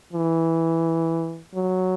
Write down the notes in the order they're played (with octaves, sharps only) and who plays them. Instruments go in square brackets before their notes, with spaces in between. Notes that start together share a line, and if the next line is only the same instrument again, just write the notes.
[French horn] E3
F#3